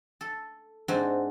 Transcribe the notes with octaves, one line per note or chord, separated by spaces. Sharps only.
A4
G#2 C4 D4 F#4